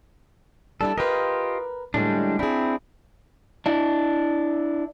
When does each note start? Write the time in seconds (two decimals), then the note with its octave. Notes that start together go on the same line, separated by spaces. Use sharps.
0.81 G3 D4 E4 A4
0.98 F4 G4 A#4 B4 D#5
1.94 A2 D3 G3 G#3 D4
2.39 C4 D4 E4 G#4
3.66 D4 E4